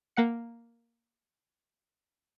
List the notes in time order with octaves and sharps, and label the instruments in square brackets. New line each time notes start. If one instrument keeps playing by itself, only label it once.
[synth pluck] A#3 F#5 C#7